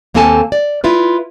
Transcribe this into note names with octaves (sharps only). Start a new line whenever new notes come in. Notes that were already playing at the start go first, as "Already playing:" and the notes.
D#2 A#3 C4 A4 G#5 A5
D5
E4 F4 B4